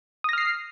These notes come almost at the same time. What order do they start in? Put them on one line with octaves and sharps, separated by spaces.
D#6 A#6 F6 C7